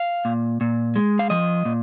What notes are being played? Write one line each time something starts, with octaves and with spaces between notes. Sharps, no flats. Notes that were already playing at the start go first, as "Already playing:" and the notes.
Already playing: F5
A#2
A#2
G#3
F5
F3 D#5
A#2